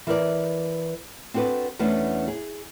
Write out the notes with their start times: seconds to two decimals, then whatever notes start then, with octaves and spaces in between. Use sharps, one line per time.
0.07 E3 A#4 B4 D5
1.34 C4 D4 F#4 A4 B4
1.79 E2 A3 B3 C#4 D4
2.28 G#4